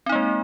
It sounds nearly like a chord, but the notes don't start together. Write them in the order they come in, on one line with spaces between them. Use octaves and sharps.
C4 D#4 A#3 G#3